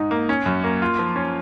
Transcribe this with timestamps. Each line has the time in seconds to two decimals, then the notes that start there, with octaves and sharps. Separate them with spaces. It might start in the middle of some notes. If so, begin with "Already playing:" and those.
Already playing: G#2 D#4
0.11 A#3
0.29 C#4
0.46 F#2
0.64 A#3
0.82 F4
0.99 F3
1.16 C#4